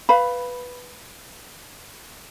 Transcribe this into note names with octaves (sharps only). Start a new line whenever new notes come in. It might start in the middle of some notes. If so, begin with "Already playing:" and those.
B4 F5 B5